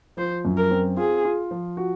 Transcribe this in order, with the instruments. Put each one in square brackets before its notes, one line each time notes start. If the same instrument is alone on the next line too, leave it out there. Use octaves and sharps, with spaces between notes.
[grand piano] F3 [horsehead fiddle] C5
[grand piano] F#2
[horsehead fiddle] A#4
[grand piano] C4
[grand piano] F4 [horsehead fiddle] G#4
[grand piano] F4
F3
F#4